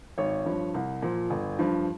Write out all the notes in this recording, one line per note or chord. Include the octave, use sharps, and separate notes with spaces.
G#1 C#5
G2 F3
C2
A#2 F3
G1
G2 F3